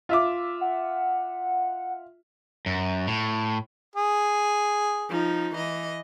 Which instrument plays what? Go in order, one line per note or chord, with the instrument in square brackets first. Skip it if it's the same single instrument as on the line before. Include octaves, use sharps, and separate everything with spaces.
[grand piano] F4 E5 D6
[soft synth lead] F#5
[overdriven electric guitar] F#2
A2
[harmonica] G#4
[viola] F3 D#4
E3 D#5